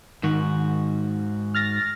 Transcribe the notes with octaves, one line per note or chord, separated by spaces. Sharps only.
G#2 D#3 F#4
F6 A6 A#6